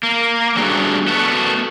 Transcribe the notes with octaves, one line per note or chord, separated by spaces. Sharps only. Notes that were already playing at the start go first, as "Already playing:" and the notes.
A#3
E2 G3 A3 D4 F#4 G#4
A3 B3 F#4